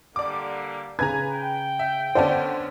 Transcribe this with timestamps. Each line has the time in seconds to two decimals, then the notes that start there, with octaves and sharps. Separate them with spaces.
0.16 D3 G3 A#3 D5 D6
0.99 C#3 B4 G#5 A#5 G#6
1.32 G5
1.79 E5
2.15 D3 B3 C#4 C5 D5 A5